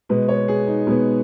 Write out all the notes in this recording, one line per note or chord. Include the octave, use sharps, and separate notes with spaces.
B2 G#3 B3 B4
C#5
G#4
D#4
B2 G#3 B3